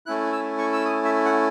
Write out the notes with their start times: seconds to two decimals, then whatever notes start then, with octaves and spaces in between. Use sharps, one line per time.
0.06 A3 C#4 E4 F#6
0.32 E6
0.58 C#6
0.73 E6
0.85 D#6
1.05 E5
1.25 F#5